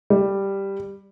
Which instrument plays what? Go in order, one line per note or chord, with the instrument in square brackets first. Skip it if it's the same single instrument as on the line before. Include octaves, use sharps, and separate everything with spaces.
[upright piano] G3